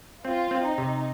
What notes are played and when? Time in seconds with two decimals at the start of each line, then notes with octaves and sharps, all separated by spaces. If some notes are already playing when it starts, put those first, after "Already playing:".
0.24 C4 F4
0.51 C4
0.65 D#4
0.78 C3